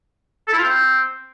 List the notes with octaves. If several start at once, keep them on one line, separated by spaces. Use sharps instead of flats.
A4
E4
F4
C4